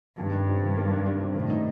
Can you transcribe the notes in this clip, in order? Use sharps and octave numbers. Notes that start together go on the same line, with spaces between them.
G2 D#3
D4
C3
D#3
A#3
D4
D4
C3
A2 D#3
D#4